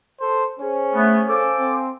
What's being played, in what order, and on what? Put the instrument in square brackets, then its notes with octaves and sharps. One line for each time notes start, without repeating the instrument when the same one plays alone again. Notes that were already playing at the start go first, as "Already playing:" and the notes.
[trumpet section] A4 C5
[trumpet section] C#4 [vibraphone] G#4 C5 C#5
[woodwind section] A3 B3
[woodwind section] A4 C5 D6 [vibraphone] F5 G#5
[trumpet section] C4